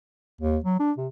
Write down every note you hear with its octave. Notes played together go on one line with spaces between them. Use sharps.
D#2
F#3
D4
C3